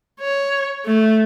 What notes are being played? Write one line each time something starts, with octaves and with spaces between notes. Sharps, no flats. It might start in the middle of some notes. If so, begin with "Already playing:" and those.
C#5
A3